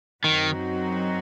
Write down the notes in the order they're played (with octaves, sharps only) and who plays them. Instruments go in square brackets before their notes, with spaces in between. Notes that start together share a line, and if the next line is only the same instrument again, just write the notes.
[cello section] F#2 F#3 C4 D#4 F#4 [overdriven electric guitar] D#3